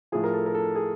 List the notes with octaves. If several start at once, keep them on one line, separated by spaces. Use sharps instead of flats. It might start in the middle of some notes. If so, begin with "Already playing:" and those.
A2 F3 G#4
A#4
A4
A#4
A4
G#4